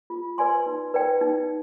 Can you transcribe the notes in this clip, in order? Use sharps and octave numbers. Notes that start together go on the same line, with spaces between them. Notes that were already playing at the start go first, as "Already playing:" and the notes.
F4
B4 D5 G#5 C6
D#4
B4 D5 G5
D#4